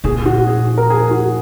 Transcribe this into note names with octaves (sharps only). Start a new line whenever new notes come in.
A#2 G#4
F#4
G#4
A#4
G#4
F#4